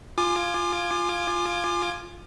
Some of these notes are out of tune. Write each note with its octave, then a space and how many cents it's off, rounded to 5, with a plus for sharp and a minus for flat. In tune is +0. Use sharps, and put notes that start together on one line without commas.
F4 +0 G#5 +0 D6 +35